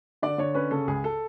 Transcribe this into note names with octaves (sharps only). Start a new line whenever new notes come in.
D3 D5
D3 C#5
C#4 B4
C#3 A4
C#2 G#4
A4